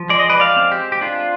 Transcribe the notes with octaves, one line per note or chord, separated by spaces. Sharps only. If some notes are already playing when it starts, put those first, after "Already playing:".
Already playing: F3
G#3 D5
D#5
B4 D5
D5 F5
C4
G4
G4
D4 F4